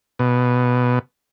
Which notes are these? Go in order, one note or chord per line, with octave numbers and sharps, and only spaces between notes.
B2